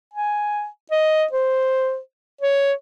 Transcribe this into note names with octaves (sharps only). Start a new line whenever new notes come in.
G#5
D#5
C5
C#5